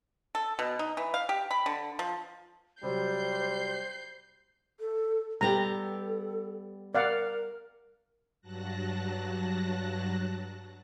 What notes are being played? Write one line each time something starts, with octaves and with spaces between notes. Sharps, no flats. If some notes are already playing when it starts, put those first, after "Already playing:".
A4
B2
D#4
E3
F5
G4
B5
D3
F3
C3 F#3 G3 C5 G6 C7
A4
G3 B3 G4 A4 A#5
A#4 D5 F5 F#5
G2 F#3 A5 F#6 A#6